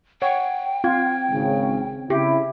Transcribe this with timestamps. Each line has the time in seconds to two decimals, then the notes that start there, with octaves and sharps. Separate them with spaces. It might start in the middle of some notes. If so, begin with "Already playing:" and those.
0.22 C#5 F#5 G5
0.84 C4 F4 G#6
1.31 G#1 C#3
2.10 C#3 E4 G4